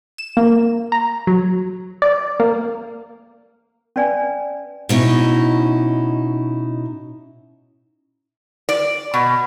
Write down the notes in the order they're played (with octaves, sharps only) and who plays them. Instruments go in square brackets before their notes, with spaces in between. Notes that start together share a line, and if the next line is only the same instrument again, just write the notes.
[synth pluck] E7
A#3
A#5
F#3
D5
A#3
[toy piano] C#4 B4 D5 G#5
[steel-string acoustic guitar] B2 C#4 D#4 E4
[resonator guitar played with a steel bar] D5
B2